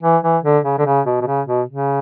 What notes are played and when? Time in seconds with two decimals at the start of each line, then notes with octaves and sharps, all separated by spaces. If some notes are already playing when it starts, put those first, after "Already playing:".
0.03 E3
0.23 E3
0.44 D3
0.64 C#3
0.78 D3
0.86 C#3
1.06 B2
1.21 B2
1.27 C#3
1.47 B2
1.69 C#3